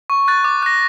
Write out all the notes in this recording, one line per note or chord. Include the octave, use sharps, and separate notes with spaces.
C#6
F#6 A6
D6
F#6 A#6